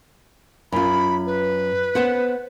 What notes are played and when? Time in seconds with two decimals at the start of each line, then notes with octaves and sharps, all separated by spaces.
0.72 F#2 F4 B5
1.26 B4
1.95 B3 C5 F#5